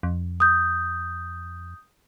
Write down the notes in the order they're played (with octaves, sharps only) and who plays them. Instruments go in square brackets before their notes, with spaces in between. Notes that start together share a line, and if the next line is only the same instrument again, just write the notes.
[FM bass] F2
[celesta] D#6 G6